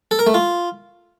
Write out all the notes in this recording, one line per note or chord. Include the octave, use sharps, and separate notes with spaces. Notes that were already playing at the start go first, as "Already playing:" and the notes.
A4
A#4
A3
F4